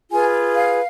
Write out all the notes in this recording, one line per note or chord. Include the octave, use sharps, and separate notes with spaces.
F4 G#4 B4 G#5
F5